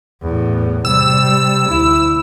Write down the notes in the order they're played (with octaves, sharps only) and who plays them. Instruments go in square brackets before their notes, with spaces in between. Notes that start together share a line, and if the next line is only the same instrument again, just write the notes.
[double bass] E2 A2
[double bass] C3 G3 [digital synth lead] E6
[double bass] D2 E4